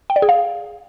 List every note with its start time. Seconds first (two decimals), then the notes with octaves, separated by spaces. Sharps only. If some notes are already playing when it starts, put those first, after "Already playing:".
0.10 G5
0.16 D5
0.22 G#4
0.29 F5